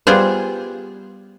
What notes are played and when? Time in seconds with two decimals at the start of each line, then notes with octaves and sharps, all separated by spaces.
0.07 G3 B3 F4 G#4 C5